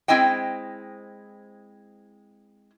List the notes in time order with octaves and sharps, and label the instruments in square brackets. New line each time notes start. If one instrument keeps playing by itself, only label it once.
[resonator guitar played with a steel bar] G#3 C4 E4 C5 D#5 G5